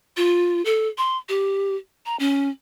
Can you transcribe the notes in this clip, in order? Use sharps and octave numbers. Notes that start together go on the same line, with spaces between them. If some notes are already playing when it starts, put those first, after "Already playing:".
F4
A4
C6
G4
A#5
C#4